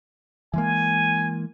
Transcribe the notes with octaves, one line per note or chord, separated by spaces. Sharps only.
E3 G#3 A#3 G#5